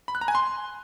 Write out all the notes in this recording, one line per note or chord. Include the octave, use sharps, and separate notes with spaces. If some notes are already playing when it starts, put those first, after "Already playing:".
B5
F#6
A#5
G#5
C6